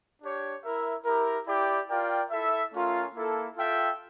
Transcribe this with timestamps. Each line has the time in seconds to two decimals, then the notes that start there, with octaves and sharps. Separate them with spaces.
0.22 D4 G4 C#5
0.63 E4 A#4 E5
1.05 E4 G4 A#4
1.47 E4 G4 D5 G5
1.89 F4 A#4 D5 G5
2.31 E4 A4 E5
2.73 A3 C#4 F4 A#4
3.15 A#3 E4 A4
3.57 F4 A4 E5 G5